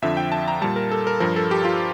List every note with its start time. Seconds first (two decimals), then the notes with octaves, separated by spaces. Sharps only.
0.02 F2 D3 F3 E5
0.17 G5
0.32 A5
0.48 A#5
0.62 A#2 G3 A5
0.76 A#4
0.91 A4
1.07 A#4
1.20 G2 F3 A#4
1.36 A4
1.51 G4
1.65 F4